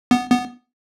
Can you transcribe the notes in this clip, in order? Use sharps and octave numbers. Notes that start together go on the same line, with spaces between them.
B3
B3